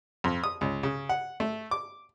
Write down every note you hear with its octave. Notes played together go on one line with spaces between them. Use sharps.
F2
D#6
C#2
C#3
F#5
A3
D6